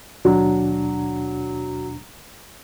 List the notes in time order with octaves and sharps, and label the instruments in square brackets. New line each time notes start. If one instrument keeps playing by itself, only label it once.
[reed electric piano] D#2 B2 D4 [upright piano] F#3